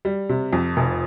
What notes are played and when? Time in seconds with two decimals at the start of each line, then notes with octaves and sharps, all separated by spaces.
0.05 G3
0.29 C3
0.53 F2
0.77 F1